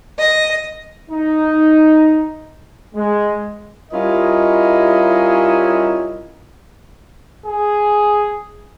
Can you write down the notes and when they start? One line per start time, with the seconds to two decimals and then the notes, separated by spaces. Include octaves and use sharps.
0.18 D#5
1.10 D#4
2.95 G#3
3.92 G3 C#4 E4 F4 A#4 D#5
7.46 G#4